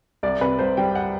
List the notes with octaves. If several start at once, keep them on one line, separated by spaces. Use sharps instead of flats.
C2 D5
C3 B4
C2 C5
G3 G5
F#5